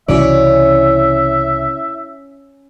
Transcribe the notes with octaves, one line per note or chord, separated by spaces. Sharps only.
C2 C#3 E3 C#4 E4 F#4 D5 E5